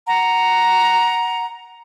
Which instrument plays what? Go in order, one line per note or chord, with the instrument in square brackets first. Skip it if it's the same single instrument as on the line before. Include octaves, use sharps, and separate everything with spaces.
[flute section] F#5 A#5